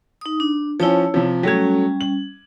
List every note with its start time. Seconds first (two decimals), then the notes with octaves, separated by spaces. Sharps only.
0.21 D#4 D#6
0.40 D4
0.80 F3 C#4 E4 C#5 A5
1.14 C3 F3
1.43 F#3 G3 A3 C#4 G#6
2.01 F#7